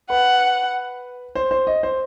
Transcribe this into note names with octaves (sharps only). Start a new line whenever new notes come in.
B4 F#5
C5
C5
D#5
C5